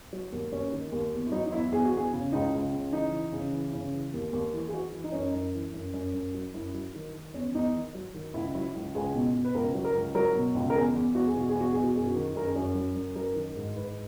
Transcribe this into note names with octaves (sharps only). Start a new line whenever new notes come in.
F#3
D#2
D#2 C#4
D#3
D#2
E2
E4
F#3 D#4
D#4
E2 E4
E2 G#4
F#4
E2 G#4
C#3
C#2 D#4
C#2
C#3
E3 D#4
E3
C#3
E3
C#3
E3
D#2
D#2
E3
G#4
E3 F#4
E3
D#4
F#2 C#4
D#4
F#2
E3
F#2
F#2
F#2
F#3
F#2 E4
F#3
D#3
D#3
E2 C#4
E2 D#4
D#3
F#3
D#3
C#2 E4
F#3 E4
C#2
C#2 G#4
B2
B2
B4
C#2 A#4
F#3
A#4
C#2
F#3 A#4
B2
C#2
A#4
E2 G#4
E2
E2 F#4
G#4
B2 F#4
G#4
E2
F#4
B2 G#4
F#4
F#2 G#4
F#4
D#3
F#2 A#4
G#4
F#2 F#4
F#3
F#2
F#3 A#4
D#3
G#2
G#2 B4